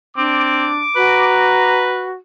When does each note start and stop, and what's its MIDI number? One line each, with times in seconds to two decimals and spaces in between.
0.17 0.71 60
0.17 0.79 62
0.17 1.69 86
0.96 2.12 66
0.96 2.11 71
0.96 1.91 82